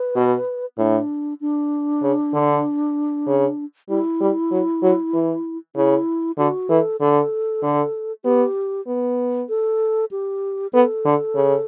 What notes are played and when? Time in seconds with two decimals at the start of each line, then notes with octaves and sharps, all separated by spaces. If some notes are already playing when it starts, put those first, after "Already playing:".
Already playing: B4
0.16 B2
0.78 A2 D4
1.41 D4
2.02 C#3
2.33 D3
3.27 C#3
3.89 G3 E4
4.21 G3
4.51 F#3
4.82 F#3
5.13 E3
5.76 C#3 E4
6.38 D3 F#4
6.69 E3 A4
7.00 D3 A4
7.63 D3
8.25 B3 G4
8.87 B3
9.49 A4
10.11 G4
10.73 B3 A4
11.05 D3
11.35 C#3